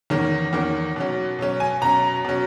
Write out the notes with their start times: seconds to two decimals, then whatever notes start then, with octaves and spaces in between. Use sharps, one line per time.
0.10 E2 D#3 A#3 C#4
0.53 E2 D#3 A#3 C#4
0.96 B2 F#3 C#4
1.39 B2 F#3 C#4
1.60 G#5
1.81 B2 F#3 C#4 A#5
2.24 B2 F#3 C#4